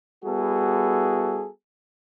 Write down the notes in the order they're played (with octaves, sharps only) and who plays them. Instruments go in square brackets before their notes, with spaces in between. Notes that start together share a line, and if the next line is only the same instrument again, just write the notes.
[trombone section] G3 B3 E4 F#4 G#4 A4